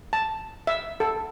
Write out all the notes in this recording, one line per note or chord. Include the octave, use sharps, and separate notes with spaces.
A5
E5
A4